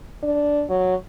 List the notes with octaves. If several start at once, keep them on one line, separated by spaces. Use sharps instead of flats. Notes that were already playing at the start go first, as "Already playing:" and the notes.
D4
F#3